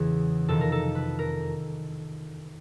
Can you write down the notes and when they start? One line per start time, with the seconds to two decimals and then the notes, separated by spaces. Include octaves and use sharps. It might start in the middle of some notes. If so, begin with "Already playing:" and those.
Already playing: E2 C#3 E3 G#4
0.48 F2 C3 D#3 A4
0.61 A#4
0.72 A4
0.95 B4
1.19 A#4